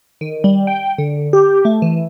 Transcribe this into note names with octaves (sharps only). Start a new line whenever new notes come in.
D#3
G3
G5
D3
G4
A3
E3